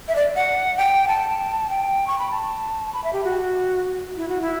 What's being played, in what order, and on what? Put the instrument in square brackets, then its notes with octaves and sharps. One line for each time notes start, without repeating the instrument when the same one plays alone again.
[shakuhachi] E5
D5
F#5
G5
A5
G5
C#6
B5
A5
B5
E5
G4
F#4
E4
F#4
E4